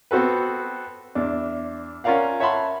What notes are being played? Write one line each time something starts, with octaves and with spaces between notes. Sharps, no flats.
B3 C4 F#4 A4 B4
E2 D4
C#4 F4 A#4 D5 F5 F#5
C#5 E5 F#5 A5 B5 C6